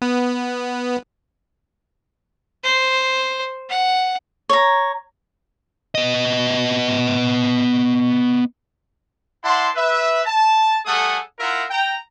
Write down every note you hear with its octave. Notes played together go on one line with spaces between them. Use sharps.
B3
C5
F#5
C#5 A#5
B3 D#5
E4 D5 F#5 A5 C6
B4 E5
A5
G3 A3 G#4 A4 F#5 D#6
E4 F4 A#4 E5 F#5 C6
G5 A#5